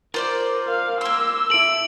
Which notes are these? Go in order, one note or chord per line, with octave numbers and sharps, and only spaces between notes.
F4 A#4 C5 D5
F5
A#3 C6 E6
E4 A4 D7 F#7